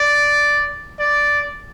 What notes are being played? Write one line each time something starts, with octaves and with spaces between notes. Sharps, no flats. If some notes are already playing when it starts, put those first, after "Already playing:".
Already playing: D5
D5